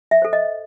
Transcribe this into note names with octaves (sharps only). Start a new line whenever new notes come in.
E5
A4 C5
D#5